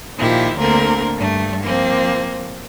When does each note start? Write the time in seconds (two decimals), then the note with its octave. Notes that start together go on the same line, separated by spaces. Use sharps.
0.17 A#2 D#3 F3 E4 G4
0.58 D2 D3 A#3 C4 A#4
1.15 G2 A3
1.62 F3 A#3 C4